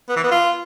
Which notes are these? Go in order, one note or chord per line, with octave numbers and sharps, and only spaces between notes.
B3
E3
B3
F4